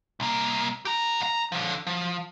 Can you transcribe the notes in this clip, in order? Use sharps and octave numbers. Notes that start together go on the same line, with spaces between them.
C2 A#3
G4 A#5
C#2 A#5
D3 F3
F3